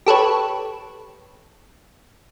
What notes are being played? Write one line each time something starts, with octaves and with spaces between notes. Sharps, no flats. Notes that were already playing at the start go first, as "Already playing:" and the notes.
G4 A4 B4 C#5